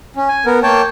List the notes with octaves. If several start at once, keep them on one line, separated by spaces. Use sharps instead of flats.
C#4
G#5
B3 A#4
A#3 C#5 G5 A5